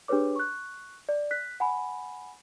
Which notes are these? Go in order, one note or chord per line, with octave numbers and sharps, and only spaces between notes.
D4 G4 G#4 B4 C#5 D6
C#6 F#6
D5
F#6 B6
F#5 G#5 B5